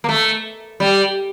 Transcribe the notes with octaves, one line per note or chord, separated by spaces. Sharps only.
A#3
A3
G3